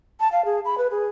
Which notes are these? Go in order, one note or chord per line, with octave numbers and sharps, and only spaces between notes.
A5
F5
G#4
B5
B4
G#4